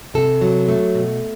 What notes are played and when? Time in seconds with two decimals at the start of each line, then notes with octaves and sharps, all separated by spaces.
0.14 C3 A4
0.41 F#3
0.69 A3
0.95 B2